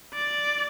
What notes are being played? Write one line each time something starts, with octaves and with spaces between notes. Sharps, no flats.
D5